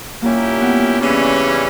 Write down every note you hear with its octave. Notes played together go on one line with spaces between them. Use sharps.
A#2 G3 A#3 C#4 E4 G4
B3
C#3 E3 G3 C#4 D4